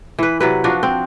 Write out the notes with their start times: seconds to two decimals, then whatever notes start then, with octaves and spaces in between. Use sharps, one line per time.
0.19 E3 B4
0.40 C3 F#3 B4
0.64 F3 D4 F#4
0.83 C4